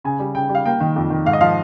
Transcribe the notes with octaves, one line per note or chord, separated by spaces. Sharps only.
C#3 G#5
G3
C#3 G5
G3
F5
A#3 G5
D#3
F2
D#3
G#2 F5
D#5
F3 F5